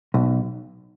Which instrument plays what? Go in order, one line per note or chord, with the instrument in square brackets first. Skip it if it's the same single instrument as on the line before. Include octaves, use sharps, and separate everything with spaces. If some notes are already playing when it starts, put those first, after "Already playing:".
[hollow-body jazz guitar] B1